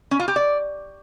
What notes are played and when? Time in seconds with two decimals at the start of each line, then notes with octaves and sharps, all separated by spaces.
0.11 C#4
0.19 F4
0.28 G4
0.36 D5